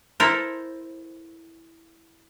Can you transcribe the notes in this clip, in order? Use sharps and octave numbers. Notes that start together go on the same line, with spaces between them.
E4 A4 A#4 C5